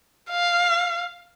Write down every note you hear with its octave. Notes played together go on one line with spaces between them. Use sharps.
F5